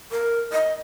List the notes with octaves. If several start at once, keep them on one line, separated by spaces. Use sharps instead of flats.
A#4
D#5